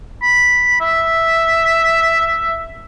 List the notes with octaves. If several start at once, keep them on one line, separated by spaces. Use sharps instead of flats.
B5
E5